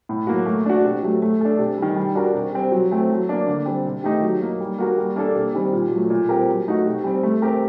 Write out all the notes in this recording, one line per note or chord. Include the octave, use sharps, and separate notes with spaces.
A2
F#3 A#3 F#4
A3
D4 F#4
C3
F#3 A3
A3
D4 A4
C3
D#3 G3
G3
D4 F#4 A#4
C3
G3 C4
F#3
A3 C4
F#3
A#3 D4
D3
G3 C4
C3
D#3 A3 D#4 G4
F#3
A#3 D#4
G3
A#3 F#4 A#4
G3
A#3 D4 A4
C3
D#3 G3 C4
A#2
F#3 A3
A#2
G3 C4 G4 A#4
F#3
A3 D#4 F#4
C3
G3 C4
A3
C4 G4 A#4